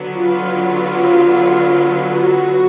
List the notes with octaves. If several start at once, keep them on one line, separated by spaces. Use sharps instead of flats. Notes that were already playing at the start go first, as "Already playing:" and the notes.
Already playing: D3 F#3 B3
F4
F#4